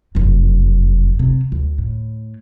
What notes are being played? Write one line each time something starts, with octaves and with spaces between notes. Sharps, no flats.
F1 F#2
C3
D2
A2